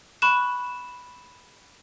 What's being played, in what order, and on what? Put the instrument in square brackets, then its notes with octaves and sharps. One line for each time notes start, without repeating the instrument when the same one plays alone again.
[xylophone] B5 C#6 F#6 E7